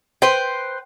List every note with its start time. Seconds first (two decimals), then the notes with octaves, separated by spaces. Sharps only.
0.22 B4 C5 G5